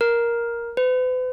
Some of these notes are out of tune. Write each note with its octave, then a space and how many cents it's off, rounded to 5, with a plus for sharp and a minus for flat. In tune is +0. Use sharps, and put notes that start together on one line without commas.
A#4 +10
B4 +45